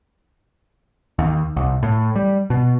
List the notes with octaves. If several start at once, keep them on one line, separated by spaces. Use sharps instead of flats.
D#2
C2
A2
G3
B2